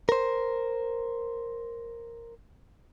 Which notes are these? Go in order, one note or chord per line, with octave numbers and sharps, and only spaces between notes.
A#4 C5